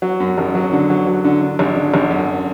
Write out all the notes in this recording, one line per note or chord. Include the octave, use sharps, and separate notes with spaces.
F#3
F#2
G#1
F#3
D3
F#3
F#3
D3
D3
G#1
D3
G#1
F#2